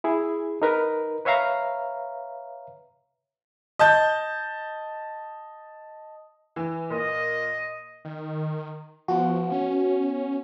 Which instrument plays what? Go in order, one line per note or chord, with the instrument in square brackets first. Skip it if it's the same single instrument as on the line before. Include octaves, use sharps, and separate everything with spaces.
[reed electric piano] E4 G#4
D#4 A#4 B4
B4 C#5 E5 F5 A#5
[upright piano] D#5 A5 G6
[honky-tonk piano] E3
[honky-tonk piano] A#2 [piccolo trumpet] D#5
[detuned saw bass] D#3
[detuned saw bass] F3 [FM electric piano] B3 F#4
[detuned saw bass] C#4